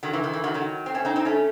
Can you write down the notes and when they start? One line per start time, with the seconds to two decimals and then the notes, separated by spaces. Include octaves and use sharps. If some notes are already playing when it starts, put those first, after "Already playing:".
0.03 D#3 F#3
0.13 E3
0.24 D#3
0.33 E3
0.44 D#3 F#3
0.54 D#3 F#3
0.86 C4
0.94 A3 C#4
1.05 C4 D#4
1.16 C4 D#4
1.25 A3 C#4